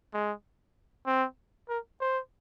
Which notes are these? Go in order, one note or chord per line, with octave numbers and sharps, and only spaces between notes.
G#3
C4
A#4
C5